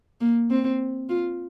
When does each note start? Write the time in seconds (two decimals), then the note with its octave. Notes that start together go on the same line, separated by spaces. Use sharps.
0.21 A#3
0.50 C4
1.09 F4